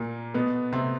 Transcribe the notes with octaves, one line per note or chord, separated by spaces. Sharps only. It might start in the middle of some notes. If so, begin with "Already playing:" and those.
Already playing: A#2 A#3
B2 B3
C3 C4